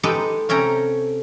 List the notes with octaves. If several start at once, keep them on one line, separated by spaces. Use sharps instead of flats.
G#3 D#4 G4 A4 B4 D#5
C3 C#4 A4 G5 A#5